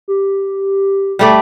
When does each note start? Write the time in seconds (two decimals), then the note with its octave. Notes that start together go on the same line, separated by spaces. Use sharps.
0.08 G4
1.19 G3 A3 D5